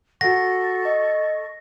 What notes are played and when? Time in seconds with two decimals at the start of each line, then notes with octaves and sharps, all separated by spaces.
0.21 F#4 A4 F#5 C#6 A#6
0.85 D#5